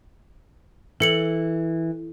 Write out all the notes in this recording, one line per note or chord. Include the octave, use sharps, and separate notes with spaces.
E3 A4 C#7 F#7